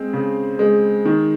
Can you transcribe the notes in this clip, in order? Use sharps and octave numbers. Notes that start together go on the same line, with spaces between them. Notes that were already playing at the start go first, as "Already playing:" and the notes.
Already playing: G#3 C4
C#3
G#3
D#3